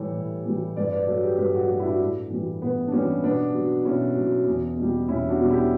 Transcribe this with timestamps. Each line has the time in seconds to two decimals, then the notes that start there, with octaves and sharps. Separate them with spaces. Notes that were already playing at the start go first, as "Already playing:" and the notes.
Already playing: A2 E3 G3 A4 C#5
0.15 A2
0.45 E3 G3
0.77 G2 B4 D5
0.92 B4 D5
1.07 F#3 A4 C#5
1.22 G4 B4
1.38 G2 G4 B4
1.54 F#4 A4
1.69 F#3
1.80 E4
1.85 D4 F#4
2.00 A2
2.30 E3 G3
2.62 A2 B3
2.88 D4
2.92 E3 G3 C#4
3.23 B2 B3 D4
3.54 F#3
3.85 B2 C#4 E4
4.16 F#3
4.47 E2
4.77 B2 G3
5.08 E2 C#4 E4
5.29 D4 F#4
5.39 B2 G3
5.50 E4 G4